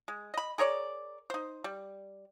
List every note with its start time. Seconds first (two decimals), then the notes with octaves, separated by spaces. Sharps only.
0.08 G#3
0.34 D#5 B5
0.58 G#4 A#4 C#5 D5
1.30 D#4 C5
1.64 G3